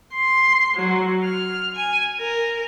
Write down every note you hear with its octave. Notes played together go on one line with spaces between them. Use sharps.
C6
F#3
F6
G#5
A#4